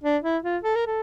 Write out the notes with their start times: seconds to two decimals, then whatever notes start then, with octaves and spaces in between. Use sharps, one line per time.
0.04 D4
0.24 E4
0.44 F4
0.63 A4
0.76 A#4
0.87 A4